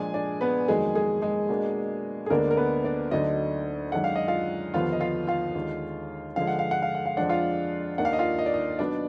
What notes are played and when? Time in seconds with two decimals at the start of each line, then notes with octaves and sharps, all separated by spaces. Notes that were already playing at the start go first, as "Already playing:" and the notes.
Already playing: A#2 F3 G#3 D4 G#4 G#5
0.14 D4 D5
0.41 B3 B4
0.68 F2 D#3 F#3 G#3 A#3 G#4
0.95 G#3 G#4
1.22 G#3 G#4
1.49 B2 A#3 D4
2.26 G#4
2.30 D2 D3 G#3 A#3 B3 D4 A#4
2.51 A#4
2.57 B3 B4
2.84 D4 D5
3.11 D2 D3 F#3 D4 D#4 D#5
3.92 F#2 D#3 G#3 D4 F#5
4.04 F5
4.16 D#5
4.28 F4 F5
4.74 D#2 D3 F3 B3 F4 F5
4.92 D#5
5.01 F4 F5
5.27 F4 F5
5.54 D#2 D3 G#3 D#4
6.36 D3 F3 G#3 F5
6.47 F#5
6.59 F5
6.71 F#5
6.82 F5
6.95 F#5
7.06 F5
7.17 F2 F3 G#3 D4 F#5
7.29 F4 F5
7.98 D#2 D#3 A#3 D4 F#5
8.05 F5
8.13 D#5
8.19 F4 F5
8.39 D#5
8.46 D5
8.54 D#4 D#5
8.79 B2 F#3 B3 D4 D#4 D5